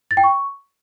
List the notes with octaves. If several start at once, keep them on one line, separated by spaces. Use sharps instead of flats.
A6
G5
C#6